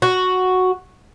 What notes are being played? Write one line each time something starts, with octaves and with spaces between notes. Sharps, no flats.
F#4